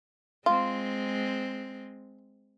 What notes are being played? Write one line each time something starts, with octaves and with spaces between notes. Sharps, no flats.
G#3 C4 F4